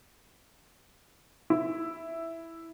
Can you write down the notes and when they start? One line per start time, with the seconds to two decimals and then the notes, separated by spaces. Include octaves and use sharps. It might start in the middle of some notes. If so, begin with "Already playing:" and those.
1.50 E4